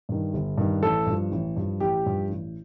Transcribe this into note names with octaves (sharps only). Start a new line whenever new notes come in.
G2 D#3
G1
G2 D#3
A1 A4
G2 F3
A1
G2 F3
A1 G4
G2 F3
A1